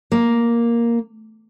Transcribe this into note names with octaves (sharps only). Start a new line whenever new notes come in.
A#3